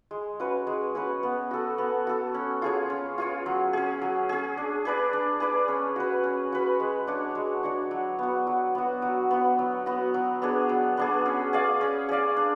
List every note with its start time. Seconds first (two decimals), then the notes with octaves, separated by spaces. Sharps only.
0.11 G#3
0.40 C#4 F#4 B4
0.67 G#3
0.95 C#4 F#4 B4
1.23 B3
1.51 F#4 A4
1.78 B3
2.07 F#4 A4
2.34 C#4
2.62 F4 G#4 C#5
2.90 C#4
3.18 F4 G#4 C#5
3.46 F#3
3.73 C#4 G#4
4.02 F#3
4.29 C#4 G#4
4.57 D4
4.85 G#4 B4 D5
5.13 D4
5.40 G#4 B4 D5
5.68 C#4
5.96 F#4 B4
6.24 C#4
6.52 F#4 B4
6.80 G#3
7.07 D4 F#4 C#5
7.35 G#3
7.63 D4 F#4 C#5
7.91 F#3
8.19 B3 F#4
8.47 F#3
8.75 B3 F#4
9.02 F#3
9.31 B3 F#4
9.59 F#3
9.86 B3 F#4
10.14 F#3
10.42 B3 D4 G#4
10.69 F#3
10.97 B3 D4 G#4
11.26 C#4
11.53 G#4 D5 F5
11.81 C#4
12.09 G#4 D5 F5
12.36 D4